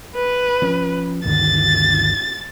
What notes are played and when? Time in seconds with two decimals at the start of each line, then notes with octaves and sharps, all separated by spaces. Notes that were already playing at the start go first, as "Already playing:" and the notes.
0.15 B4
0.62 F3 C#4
1.25 G1 D2 D#3 A6